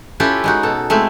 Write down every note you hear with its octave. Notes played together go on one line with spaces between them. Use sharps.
C#4 E4 F4 G4 A4 B4
G#3 D#4 F#4
B2 A4
G#3 A3 C4 E4